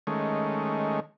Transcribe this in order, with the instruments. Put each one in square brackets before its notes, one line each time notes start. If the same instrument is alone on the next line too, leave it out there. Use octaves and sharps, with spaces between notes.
[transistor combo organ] D#3 G#3 A3 C#4